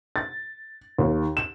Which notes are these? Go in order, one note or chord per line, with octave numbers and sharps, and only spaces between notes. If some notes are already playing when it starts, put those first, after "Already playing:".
A6
D#2
E7